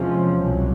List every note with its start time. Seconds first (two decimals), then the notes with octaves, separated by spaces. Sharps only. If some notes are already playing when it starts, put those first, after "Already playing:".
Already playing: E2 C3 F3 G#3 C#4
0.44 C2 B2 F#3